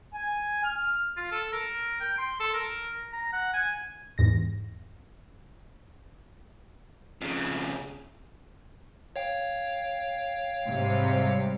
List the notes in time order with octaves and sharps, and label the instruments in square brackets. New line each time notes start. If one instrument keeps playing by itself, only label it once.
[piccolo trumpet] G#5
F6
[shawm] F4
A4
A#4
G5
C6
A4
A#4
A#5
F#5
G#5
[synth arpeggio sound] E2 G#2 A#6
[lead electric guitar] F2 C#3
[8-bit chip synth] C#5 F5 G5
[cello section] G#2 C3 G3